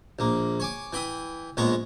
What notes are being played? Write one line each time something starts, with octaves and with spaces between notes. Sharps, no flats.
A#1 A#3
C#5 G#5 D6
E3 G5 B5 D#6
A#1 G#3 B3 C#5 A#5